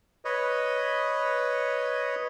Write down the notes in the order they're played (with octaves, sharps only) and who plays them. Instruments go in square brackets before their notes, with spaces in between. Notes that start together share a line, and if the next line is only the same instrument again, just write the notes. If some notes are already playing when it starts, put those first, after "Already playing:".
[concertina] B4 C#5 D#5